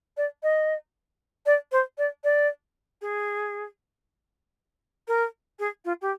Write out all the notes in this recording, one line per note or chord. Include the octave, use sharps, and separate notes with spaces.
D5
D#5
D5
C5
D5
D5
G#4
A#4
G#4
F4
G4